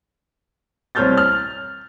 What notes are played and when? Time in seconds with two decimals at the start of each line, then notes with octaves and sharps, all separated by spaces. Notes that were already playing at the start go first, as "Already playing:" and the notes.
0.95 C2 C5 C#5 F6 G6 A6
1.17 F6